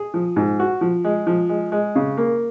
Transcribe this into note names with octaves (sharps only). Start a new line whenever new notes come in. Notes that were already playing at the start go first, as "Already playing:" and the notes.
Already playing: G#4
F3
G#2
F#4
F3
G#3
F3
G#3
G#3
C#3
A#3